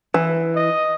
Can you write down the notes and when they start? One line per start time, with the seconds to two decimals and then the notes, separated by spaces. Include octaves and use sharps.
0.14 E3
0.56 D#5